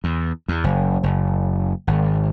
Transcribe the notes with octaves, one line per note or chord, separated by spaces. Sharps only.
E2
E2
F#1
F#1
G#1